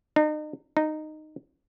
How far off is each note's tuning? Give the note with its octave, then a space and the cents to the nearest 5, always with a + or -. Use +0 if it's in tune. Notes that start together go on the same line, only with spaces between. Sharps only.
D#4 -35
D#4 -10